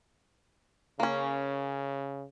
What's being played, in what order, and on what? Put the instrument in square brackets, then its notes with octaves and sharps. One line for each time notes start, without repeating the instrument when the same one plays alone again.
[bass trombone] C#3 [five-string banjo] A#3 C#4